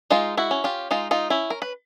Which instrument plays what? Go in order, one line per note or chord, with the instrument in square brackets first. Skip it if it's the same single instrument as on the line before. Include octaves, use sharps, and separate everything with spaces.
[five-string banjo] G#3 D#4 F4
E4 F#4
C#4
F4 G4
G#3 D#4 F4
D#4 F4
C#4 E4
A#4
B4